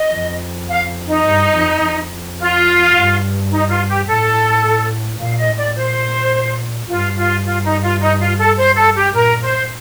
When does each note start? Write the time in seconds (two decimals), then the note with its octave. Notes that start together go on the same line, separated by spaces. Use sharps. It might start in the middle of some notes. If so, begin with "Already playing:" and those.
Already playing: D#5
0.13 F2
0.69 F5
1.06 D#4
1.25 G2
1.54 F2
1.82 F2
2.38 F4
2.94 G2
3.51 D#4
3.69 F4
3.87 G4
4.06 A2 A4
5.19 A#2 F5
5.38 D#5
5.47 A2
5.57 D5
5.75 A#2 C5
6.88 G2 F4
7.17 F4
7.45 F4
7.63 D#4
7.83 F4
8.01 D#4
8.20 F4
8.39 A4
8.57 C5
8.76 A4
8.95 G4
9.13 A#2 A#4
9.42 C5